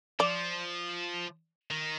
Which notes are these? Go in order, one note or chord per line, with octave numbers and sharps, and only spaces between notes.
F3 D5
D#3